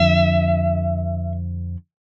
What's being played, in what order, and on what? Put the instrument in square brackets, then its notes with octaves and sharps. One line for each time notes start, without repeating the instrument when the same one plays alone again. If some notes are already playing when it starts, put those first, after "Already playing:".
Already playing: [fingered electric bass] F2 D3 F3 [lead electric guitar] E5